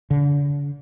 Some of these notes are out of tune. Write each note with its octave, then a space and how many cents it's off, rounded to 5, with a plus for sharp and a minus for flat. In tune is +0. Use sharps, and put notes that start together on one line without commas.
D3 -40